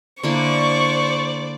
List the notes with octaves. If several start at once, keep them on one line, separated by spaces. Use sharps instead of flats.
D3 A#3 E4 C5 D5 C#6